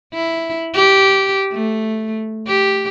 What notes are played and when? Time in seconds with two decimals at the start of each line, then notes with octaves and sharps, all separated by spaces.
0.14 E4
0.74 G4
1.52 A3
2.47 G4